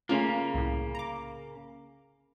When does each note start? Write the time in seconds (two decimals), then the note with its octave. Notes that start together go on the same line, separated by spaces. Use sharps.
0.09 C#3 A3 A#3 C#4 F4
0.54 C2 A2
0.95 A#5 D6